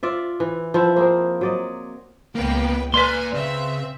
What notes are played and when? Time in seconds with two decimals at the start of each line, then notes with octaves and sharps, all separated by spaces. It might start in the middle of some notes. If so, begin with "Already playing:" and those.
0.03 F4 D5 E5
0.40 E3
0.74 F3 C4 E4
0.96 A#3 C4 G#4 A#4
1.41 F#3 D5 D#5
2.35 C#2 A#3 B3 B4 G5
2.94 A#3 B4 D5 G#5 C6 F6
3.34 C#3 C4 E5 F5